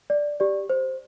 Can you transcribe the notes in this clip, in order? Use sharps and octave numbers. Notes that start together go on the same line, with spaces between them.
D5
G4 D5
C5